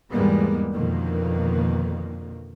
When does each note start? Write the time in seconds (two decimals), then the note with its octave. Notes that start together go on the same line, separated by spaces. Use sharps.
0.11 E2 G#2 G3 G#3 A#3 B3
0.73 F2 B2 D3 D#3 A#3